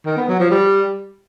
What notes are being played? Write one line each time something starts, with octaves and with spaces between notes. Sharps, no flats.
D#3
B3
F#3
F3
G3